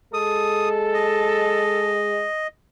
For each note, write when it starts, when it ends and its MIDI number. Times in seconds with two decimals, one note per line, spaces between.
0.14 2.25 56
0.14 1.98 69
0.14 0.69 87
0.94 2.47 75